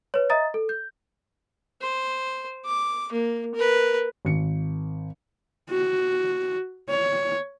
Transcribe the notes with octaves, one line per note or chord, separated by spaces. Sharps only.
B4 C#5
D#5 E5 A#5 D#6 A6
A4
G6
C5
D6
A#3
A#4 B4
G#1 C#7
F#4
C#5